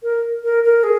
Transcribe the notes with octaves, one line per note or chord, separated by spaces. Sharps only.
A#4
A#4
A#4
G#4